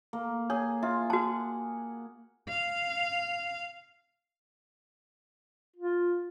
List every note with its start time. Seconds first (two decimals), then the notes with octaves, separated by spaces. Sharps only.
0.13 A#3
0.50 G#4 C#5
0.83 F4 E5
1.10 F#4 F#5 A5
2.49 F5
5.76 F4